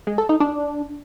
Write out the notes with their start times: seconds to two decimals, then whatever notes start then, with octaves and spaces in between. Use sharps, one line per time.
0.07 G#3
0.18 A4
0.29 D#4
0.40 D4